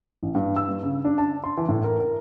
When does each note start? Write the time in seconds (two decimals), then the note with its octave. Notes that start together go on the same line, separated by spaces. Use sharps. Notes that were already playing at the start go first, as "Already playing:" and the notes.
0.23 A1
0.35 G2
0.56 E6
0.69 G2
0.83 C#3
1.05 D4
1.18 A5
1.44 C6
1.57 E3
1.69 A2
1.84 A#4
2.00 A#4